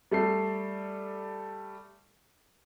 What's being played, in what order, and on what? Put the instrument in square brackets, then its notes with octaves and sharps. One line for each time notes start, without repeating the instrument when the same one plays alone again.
[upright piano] G3 A3 A4 C7